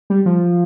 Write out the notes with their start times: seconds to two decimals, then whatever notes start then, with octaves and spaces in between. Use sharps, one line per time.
0.10 G3
0.26 F3